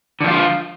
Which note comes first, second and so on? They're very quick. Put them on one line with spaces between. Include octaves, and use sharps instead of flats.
D3 F3 F4